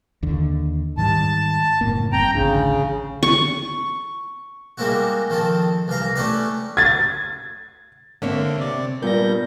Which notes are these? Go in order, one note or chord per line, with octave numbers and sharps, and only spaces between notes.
D#2 D3
G#2 D#3 G3 A5
F#1 A2 A#3
F#1 G2 C4 G5 A#5
A1 D2 C#3 D4
C#6
G3 G#3 A#3 C4 E4 F#4
D#3 F3 C4 A4
C2 E3 F5 A#5
A3 C#4 E4 G4 B4 D5
G#6 A6
D3 A#3 C4 C#5 E5
C3 D5
G2 A#2 G3 B3 G6 A#6